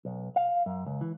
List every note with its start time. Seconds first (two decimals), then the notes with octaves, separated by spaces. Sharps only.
0.05 B1
0.36 F5
0.66 F#2
0.86 C#2
1.01 E3